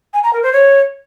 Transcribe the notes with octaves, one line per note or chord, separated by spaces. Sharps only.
G#5
A#5
A#4
C5
C#5